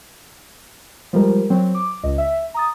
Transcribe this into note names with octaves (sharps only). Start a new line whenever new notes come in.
F3 G3 G#3 A#4
F#3 C4
D6
C#2 D#5
E5
A#5 D#6 A6